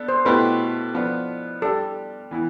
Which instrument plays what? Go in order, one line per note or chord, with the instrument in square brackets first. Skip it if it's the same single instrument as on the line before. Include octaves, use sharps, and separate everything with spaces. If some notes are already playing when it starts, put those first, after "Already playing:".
Already playing: [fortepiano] B3 D4 A4
[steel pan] C5
[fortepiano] B2 A3 E4 G4 [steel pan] B4
[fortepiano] F3 B3 D4
[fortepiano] G3 D4 G4 [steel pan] A4
[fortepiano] E3 B3 E4